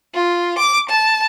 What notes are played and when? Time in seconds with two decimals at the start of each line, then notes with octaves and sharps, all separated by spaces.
0.14 F4
0.58 D6
0.89 A5